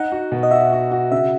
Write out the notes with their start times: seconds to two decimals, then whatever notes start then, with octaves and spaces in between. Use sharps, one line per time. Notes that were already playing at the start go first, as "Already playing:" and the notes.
Already playing: D#4 F#5
0.12 F#4
0.32 B2
0.43 D#5
0.51 F#4 E5
0.72 F#4
0.92 F#4
1.12 C#3 E5